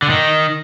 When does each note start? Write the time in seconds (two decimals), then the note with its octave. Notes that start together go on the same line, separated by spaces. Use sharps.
0.02 D3
0.10 D#3